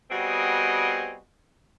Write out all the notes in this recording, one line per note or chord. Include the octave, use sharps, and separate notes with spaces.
G3 B3 C4 F#4 G#4 D#5